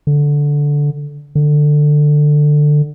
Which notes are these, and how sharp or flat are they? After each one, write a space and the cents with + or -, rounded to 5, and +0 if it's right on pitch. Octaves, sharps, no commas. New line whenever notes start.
D3 -10
D3 +15